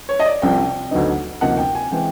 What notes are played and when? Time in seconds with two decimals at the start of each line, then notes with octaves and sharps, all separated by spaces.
0.09 C#5
0.19 D#5
0.26 D5
0.42 C2 C3 F3 G5
0.91 D2 D3 F#3 B3 D#4
1.41 D2 C3 F3 A#3 D#4 F#5
1.58 G5
1.75 G#5
1.92 E3 G#3 C4 G5